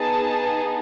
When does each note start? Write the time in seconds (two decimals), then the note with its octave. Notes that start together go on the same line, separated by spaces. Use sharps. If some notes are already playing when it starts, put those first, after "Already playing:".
Already playing: B3 D#4 G#4 A5